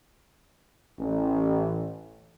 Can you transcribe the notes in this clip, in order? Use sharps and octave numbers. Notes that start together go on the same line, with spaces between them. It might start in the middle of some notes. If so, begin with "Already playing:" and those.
A1